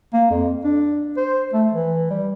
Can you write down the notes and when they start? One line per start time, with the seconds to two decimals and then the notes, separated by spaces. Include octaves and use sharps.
0.13 A#3
0.30 F2
0.64 D4
1.17 C5
1.53 A3
1.73 E3
2.10 G3